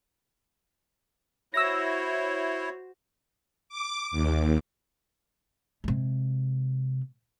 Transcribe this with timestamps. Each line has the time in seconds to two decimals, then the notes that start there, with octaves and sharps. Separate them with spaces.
1.54 E4 F#4 C5 C#5 E6 A#6
3.69 D6
4.11 D#2
5.84 C3 G#3